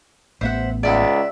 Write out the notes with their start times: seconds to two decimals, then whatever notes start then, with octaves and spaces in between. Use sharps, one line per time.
0.41 A1 B3 C5 E5 F#5
0.83 C#2 D5 E5 F#5